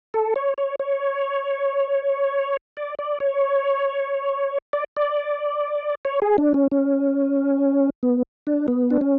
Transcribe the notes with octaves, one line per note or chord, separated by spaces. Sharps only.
A4
C#5
C#5
C#5
D5
D5
C#5
D5
D5
C#5
G#4
D4
C#4
C#4
B3
D4
B3
D4
C#4